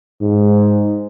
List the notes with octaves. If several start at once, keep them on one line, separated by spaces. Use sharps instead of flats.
G#2